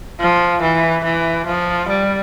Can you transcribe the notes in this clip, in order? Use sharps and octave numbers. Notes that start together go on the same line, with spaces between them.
F3
E3
E3
F3
G3